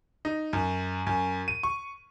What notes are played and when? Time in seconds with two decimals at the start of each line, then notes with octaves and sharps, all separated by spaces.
0.25 D#4
0.53 F#2
1.07 F#2
1.48 D#7
1.63 C#6